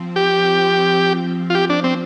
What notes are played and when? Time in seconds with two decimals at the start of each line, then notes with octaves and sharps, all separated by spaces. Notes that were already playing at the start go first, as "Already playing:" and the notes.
Already playing: F3 C4
0.16 G4
1.50 F4
1.55 G4
1.69 D4
1.84 C4